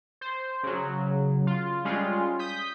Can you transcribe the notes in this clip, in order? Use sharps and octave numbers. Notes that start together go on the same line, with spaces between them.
C5
C#3 F#3
F4
G3 G#3 C#4 F4
D#6 G6 B6